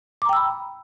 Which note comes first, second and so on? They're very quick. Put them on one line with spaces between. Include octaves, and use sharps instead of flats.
D6 A#5 G5 E6 B5